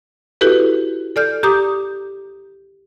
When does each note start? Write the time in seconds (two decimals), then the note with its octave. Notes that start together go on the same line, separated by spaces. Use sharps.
0.41 E4 F#4 G4 A4 B4
1.16 A4 D5 F6 G6
1.43 G4 A#5 D6 D#6 G6